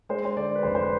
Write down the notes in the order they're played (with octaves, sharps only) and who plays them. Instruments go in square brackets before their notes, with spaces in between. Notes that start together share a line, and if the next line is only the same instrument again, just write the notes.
[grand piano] G#3 C5
C5
D3 D5
B4
F1 C5
C5
B4